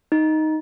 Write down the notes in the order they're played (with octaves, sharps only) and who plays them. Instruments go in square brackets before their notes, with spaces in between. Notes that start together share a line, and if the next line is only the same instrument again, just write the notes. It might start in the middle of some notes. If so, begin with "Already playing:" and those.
[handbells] D#4